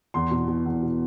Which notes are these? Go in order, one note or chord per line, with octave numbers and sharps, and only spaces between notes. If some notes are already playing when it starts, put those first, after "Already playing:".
E2 C6
B2
B2
E2
B2